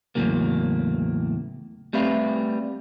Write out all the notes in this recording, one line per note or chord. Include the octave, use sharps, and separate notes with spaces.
E2 A2 C#3 F#3 A#3
G3 A3 C4 B4 E5 F5